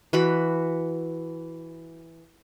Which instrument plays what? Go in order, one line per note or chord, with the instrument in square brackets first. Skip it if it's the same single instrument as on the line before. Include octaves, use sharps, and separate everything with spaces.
[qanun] E3 F#4 B5